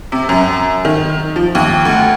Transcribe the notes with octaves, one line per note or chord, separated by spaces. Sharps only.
C3
F#2
D#3
F3
D#2
D2